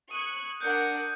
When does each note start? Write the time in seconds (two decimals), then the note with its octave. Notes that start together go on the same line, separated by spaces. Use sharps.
0.10 C#6 D#6 F#6 G#6 D#7
0.60 D4 A#4 F#5 F#6 G6 C#7